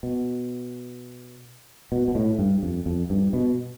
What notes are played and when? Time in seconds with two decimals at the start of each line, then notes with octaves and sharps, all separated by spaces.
0.03 B2
1.92 B2
2.08 B2
2.15 A2
2.39 G2
2.63 F2
2.86 F2
3.10 G2
3.33 B2